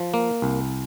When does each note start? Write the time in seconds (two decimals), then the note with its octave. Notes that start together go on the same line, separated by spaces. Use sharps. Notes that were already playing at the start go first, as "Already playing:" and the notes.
Already playing: F3
0.14 A#3
0.42 C2